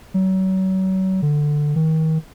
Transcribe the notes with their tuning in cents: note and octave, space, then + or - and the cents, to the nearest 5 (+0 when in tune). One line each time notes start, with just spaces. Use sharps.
F#3 +35
D3 +10
D#3 +35